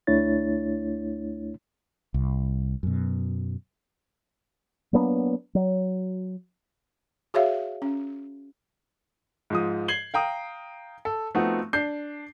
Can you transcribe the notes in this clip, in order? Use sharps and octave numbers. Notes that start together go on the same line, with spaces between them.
D2 A3 D4 E4 C#5 A6
C2
F#2 B2
F#3 A#3 B3 D4
F#3
F#4 G#4 C#5 E5 F5
C#4
G#2 F3 D#6
G#6 C7 F#7 G7
F5 G5 A#5 D#6
A4
F3 A3 B3 C4 D#4 F#4
D4 G6 C7